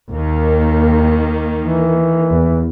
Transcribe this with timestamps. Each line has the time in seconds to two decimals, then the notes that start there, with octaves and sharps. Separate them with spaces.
0.11 D#2 D#3 A#3
1.58 E3
2.31 E2